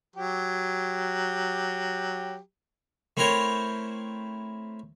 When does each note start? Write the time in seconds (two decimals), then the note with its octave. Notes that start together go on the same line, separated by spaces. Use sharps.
0.16 F#3 G4
3.17 A3 C4 E4 A#4 C5 C#5